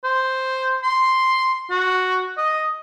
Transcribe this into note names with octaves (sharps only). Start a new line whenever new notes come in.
C5
C6
F#4
D#5